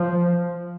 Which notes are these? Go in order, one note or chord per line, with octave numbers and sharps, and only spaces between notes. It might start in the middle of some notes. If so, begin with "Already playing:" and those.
Already playing: F3